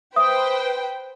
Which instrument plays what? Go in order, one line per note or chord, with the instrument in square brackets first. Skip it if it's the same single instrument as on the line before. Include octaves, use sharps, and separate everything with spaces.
[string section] B4 C5 G5 [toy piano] E5 D#6